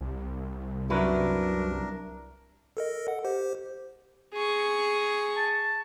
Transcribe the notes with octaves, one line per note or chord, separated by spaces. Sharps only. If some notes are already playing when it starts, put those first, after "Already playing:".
C2
F#2 F#3 D4 E4 A#4 B4
A4 A#4 D#5
F#5
G4 C5
G#4 C#6
A5